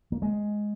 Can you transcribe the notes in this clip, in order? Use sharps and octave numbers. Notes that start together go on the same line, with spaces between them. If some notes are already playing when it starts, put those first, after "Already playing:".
A#3
G#3